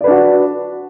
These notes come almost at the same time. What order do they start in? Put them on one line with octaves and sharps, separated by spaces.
D5 B4 D4 F#4